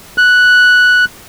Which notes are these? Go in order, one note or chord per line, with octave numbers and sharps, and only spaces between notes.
F#6